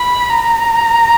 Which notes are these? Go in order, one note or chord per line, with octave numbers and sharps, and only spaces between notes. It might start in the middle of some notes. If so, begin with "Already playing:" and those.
Already playing: B5
A#5